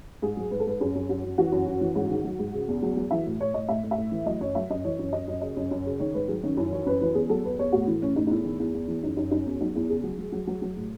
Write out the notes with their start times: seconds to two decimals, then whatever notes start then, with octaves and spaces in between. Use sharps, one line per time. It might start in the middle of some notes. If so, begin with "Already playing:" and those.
0.22 G#2 G#4
0.37 F#3
0.51 G#2 B4
0.60 A4
0.66 G#2 B4
0.80 F#2 G#4
0.95 F#2
1.09 F#2 F#4
1.24 F#2
1.38 E3 F#4
1.52 F#2
1.66 F#2
1.81 E3
1.95 G#2
2.10 D#3
2.24 F#3
2.39 G#2
2.54 C#3
2.68 E2
2.82 F#3
2.97 F#3
3.11 E3 E5
3.26 A2
3.40 A2 C#5
3.54 A2 D#5
3.69 A2 E5
3.84 A2
3.91 E5
3.98 A2
4.12 E3
4.26 F#3 D#5
4.40 F#2 C#5
4.55 F#3 E5
4.70 F#2 D#5
4.85 E3 C#5
4.99 F#2
5.13 F#2 D#5
5.28 F#2
5.41 C#3 D#5
5.57 F#2
5.71 F#2
5.86 C#3
5.99 D#3 C#5
6.14 G#2 B4
6.28 F#3 G#4
6.43 D#3 C#4
6.57 F#2 E4
6.72 E3 C#5
6.86 F#2 B4
7.01 E3 B4
7.15 E2 G#4
7.29 F#3 A4
7.44 E2 B4
7.59 E2 C#5
7.72 A2 F#4
7.87 E3 E4
8.02 A2 C#4
8.16 A2 D#4
8.27 D#4
8.30 E2 E4
8.45 D#3
8.59 E2 E4
8.74 E2
8.88 E3
9.03 F#2 D#4
9.17 F#2 D#4
9.31 F#2 D#4
9.46 E2 C#4
9.61 F#3 D#4
9.75 E2 E4
9.89 C#3 G#4
10.04 F#3
10.18 F#3
10.32 F#3
10.47 F#3
10.62 F#3
10.76 A2